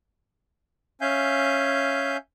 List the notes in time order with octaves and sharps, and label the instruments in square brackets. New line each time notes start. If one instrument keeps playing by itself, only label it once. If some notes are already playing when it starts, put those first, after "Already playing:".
[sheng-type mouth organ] C#4 E5 F5 G#5 G6